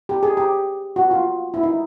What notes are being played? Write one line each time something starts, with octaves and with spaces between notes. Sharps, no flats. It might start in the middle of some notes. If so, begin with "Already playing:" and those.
G4
G#4
G4
F#4
F4
E4
D#4